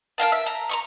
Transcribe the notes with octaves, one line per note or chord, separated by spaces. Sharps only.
A#4 D#5 F5 A5
E5
A#5
A#5 C6 C#6